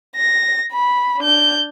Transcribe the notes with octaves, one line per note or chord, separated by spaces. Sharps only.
A#6
B5
D4 G6